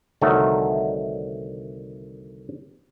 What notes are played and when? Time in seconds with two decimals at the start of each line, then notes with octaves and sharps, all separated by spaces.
0.21 C2 D3 D#3 A3 F#4 C#5